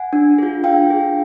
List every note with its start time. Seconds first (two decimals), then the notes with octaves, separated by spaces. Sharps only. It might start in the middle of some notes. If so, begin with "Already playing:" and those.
Already playing: F#5 G#5
0.13 D4
0.38 F4 G#4
0.64 D4 F5 G5
0.89 F4 G#4